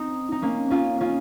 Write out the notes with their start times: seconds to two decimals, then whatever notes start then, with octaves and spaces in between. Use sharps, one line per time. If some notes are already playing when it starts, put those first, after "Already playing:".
Already playing: C4 D#4
0.32 D#4
0.42 A#3 C#4
0.70 C#4 F4
1.00 C#4 F4